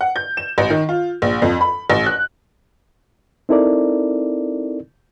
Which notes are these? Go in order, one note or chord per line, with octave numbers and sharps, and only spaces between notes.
F#5
G6
E7
A1
D#3
F4
A#1
F2
B5
A1
F#6
C4 D#4 E4 A4 A#4 D5